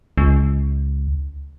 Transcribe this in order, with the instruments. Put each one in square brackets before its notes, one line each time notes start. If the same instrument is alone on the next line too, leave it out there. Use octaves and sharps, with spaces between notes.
[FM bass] C#2